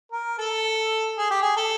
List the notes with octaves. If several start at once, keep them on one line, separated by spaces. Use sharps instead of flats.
A#4
A4
G#4
G4
G#4
A4